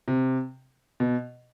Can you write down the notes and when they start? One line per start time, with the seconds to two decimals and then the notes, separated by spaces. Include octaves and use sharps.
0.08 C3
1.00 B2